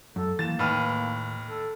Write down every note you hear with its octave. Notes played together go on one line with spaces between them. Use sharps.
F#2 A4
D#2 E3 A#3 A6 E7
D#2 A2 D#3 B4 F6
A4